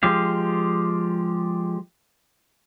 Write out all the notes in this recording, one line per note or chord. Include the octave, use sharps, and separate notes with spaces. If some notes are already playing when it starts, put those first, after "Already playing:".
F3 G#3 G4 F5